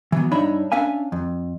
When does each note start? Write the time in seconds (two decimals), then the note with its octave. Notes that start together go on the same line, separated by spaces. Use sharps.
0.12 E3 F#3 B3
0.31 G2 D4 D#4 C#5 E5 B5
0.72 C#4 D4 E5 F5 G#5
1.12 F2